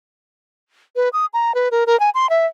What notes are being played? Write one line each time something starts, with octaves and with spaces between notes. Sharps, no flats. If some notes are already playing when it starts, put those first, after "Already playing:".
B4
D#6
A#5
B4
A#4
A#4
G#5
C6
E5